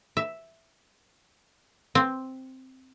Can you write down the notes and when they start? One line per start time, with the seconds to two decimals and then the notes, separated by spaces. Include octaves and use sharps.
0.17 E5
1.95 C4